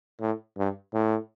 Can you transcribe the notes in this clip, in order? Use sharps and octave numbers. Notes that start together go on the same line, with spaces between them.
A2
G2
A2